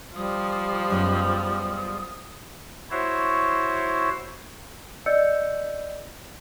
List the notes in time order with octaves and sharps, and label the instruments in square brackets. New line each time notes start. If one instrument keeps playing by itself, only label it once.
[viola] F3 [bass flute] G3 [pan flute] D#6
[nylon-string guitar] F#2 G#3 B3
[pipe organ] E4 F#4 C5 C#5
[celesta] D5 D#5 E6 G6 C#7